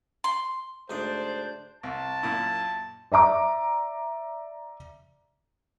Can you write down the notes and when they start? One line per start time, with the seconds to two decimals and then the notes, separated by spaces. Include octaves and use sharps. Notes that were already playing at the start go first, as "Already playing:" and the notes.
0.24 C6
0.90 D2 G#2 D4 C5 D#5 G6
1.83 C2 A5
2.23 F#2 A#2 E4
3.12 D5 E5 A#5 D6